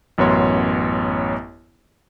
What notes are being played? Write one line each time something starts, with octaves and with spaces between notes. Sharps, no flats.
A1 F#2 B3 C#5 C6